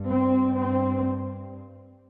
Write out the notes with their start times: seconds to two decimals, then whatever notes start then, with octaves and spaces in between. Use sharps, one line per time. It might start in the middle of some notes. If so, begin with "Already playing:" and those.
Already playing: G2
0.09 C4
0.58 C4